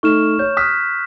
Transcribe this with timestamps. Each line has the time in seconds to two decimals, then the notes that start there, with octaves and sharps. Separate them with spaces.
0.03 A3 D#4 C#6 F6 E7
0.39 C#5 G6
0.57 D#6 F6 F#6 B6